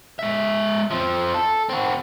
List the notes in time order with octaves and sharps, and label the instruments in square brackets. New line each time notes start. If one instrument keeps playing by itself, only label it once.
[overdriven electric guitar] G#3 E5
F3 C4
A4
C4 F#4